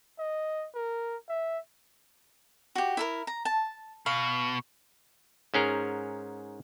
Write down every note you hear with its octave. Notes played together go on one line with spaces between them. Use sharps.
D#5
A#4
E5
F#4 G4
E4 A4 A#4
A#5
A5
B2 F5
G#2 C#4 G#4 A#4